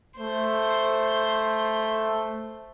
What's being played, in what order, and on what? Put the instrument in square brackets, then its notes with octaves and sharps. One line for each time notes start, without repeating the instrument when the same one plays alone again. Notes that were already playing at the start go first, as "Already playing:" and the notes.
[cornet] A3 [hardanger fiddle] C5